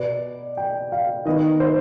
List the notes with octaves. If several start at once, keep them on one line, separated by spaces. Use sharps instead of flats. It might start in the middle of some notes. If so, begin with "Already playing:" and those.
Already playing: B2 B3 D5
G5
F5
D#3 B3 D#5
C5